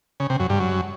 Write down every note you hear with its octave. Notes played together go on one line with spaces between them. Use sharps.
C#3
C3
F#2
G2
F#2